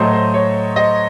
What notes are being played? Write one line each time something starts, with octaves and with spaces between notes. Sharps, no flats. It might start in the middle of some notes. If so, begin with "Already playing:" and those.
Already playing: A2 F#3 A3 C5 D#5
C5
C#5
C5 D#5